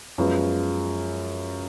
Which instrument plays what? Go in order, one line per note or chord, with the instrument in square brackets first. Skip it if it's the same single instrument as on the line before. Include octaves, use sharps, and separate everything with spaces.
[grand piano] F#2 F3 G#3 B3 F#4